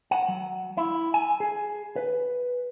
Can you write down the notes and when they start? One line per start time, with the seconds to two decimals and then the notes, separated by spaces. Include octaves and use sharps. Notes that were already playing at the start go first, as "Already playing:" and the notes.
0.11 F#5
0.28 F#3
0.77 E4
1.14 G#5
1.40 G#4
1.96 B4